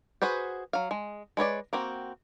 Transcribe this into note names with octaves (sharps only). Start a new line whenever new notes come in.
F#4 G#4 B4 C5
F#3 F5
G#3
G#3 B4 C#5 D5
A#3 C4 F#4